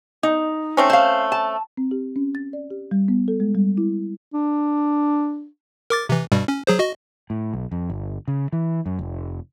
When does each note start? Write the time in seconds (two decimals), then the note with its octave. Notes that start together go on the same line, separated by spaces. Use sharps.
0.23 D#4
0.77 A3 C4 C#4
0.90 C5 F5
1.32 A5
1.77 C4
1.91 G4
2.16 C#4
2.35 A6
2.53 D5
2.70 G4
2.91 G3
3.08 B3
3.28 A4
3.40 G#3
3.55 G3
3.78 E4
4.33 D4
5.90 A#4 D6 A6
6.09 C3 E3
6.32 G2 B2 G3
6.48 C#4
6.67 F#3 G#4 C5
6.79 F#4 D#5
7.30 A2
7.53 B1
7.71 F2
7.90 G1
8.28 C#3
8.52 E3
8.86 F#2
8.99 F1